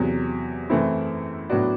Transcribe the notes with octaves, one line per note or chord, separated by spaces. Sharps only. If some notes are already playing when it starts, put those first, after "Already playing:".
Already playing: E2 C3 F#3
F#2 E3 A3 C4 E4
A2 F#3 B3 D4 F#4